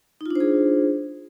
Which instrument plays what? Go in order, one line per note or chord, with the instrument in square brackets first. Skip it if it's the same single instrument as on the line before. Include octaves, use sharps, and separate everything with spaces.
[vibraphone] D#4
F4
D4
C5
G#4